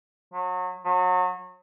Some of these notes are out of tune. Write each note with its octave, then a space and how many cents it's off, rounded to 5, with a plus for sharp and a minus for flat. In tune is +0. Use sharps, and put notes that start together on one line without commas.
F#3 -30
F#3 -30